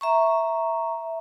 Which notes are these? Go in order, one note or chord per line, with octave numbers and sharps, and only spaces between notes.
E5 A#5 C#6